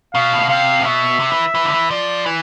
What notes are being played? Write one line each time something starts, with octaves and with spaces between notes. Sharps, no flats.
B2 F5
A2
B2
C3 F5
A2
B2 E5
C3
E3
E3
D3
E3
F3 D5
E3